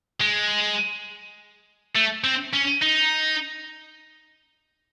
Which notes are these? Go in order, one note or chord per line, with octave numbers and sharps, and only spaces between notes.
G#3
A3
C4
C#4
D#4